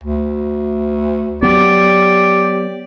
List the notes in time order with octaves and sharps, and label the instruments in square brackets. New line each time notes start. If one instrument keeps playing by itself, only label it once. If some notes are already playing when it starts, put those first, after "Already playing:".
[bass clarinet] D2
[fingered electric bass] F#3 B3 [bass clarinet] G4 [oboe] D5